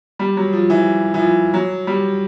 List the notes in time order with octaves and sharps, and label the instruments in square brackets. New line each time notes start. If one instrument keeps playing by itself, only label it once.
[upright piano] G3
F#3
F3
E3
E3
F3
F#3
G3